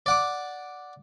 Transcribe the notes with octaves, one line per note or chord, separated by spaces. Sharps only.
D5 F#5 D6